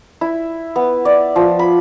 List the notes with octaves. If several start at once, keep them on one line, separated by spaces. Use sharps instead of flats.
E4
B3
D5
F3
B5